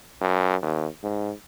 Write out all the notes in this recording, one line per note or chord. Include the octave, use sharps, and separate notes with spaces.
F#2
D#2
G#2